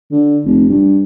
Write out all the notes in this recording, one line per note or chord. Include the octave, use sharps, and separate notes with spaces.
D3
F1
G2